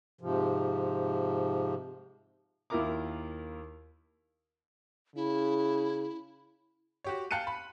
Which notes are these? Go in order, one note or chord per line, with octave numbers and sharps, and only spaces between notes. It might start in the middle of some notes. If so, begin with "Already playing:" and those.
G#2 C3 F3
D#2 E4 F4 A#4 A#5 D6
C#3 E4
F#4 G4 C#5
F5 G5 A5 F#6 C#7 D#7
B5